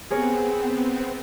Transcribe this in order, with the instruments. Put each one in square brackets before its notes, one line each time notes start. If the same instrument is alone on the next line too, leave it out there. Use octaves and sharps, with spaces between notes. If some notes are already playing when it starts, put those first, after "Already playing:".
[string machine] B3 C4 [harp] G#4 A#4 C#5